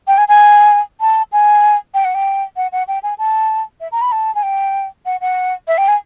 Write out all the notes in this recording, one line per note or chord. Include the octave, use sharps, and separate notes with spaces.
G5
G#5
G#5
A5
G#5
G5
F#5
G5
F#5
F#5
G5
G#5
A5
E5
A#5
B5
A5
G#5
G5
F#5
F#5
E5
G5
G#5